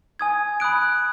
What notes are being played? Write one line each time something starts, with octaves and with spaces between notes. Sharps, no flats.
G#5 D#6 G#6
B5 D#6 F#6 D7